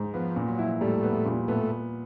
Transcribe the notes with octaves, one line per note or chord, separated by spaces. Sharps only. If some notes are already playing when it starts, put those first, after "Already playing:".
Already playing: G#2
F3 B3
A#2
F#3
E4
A2 G3 A3
B3
A#2
A2 A3 B3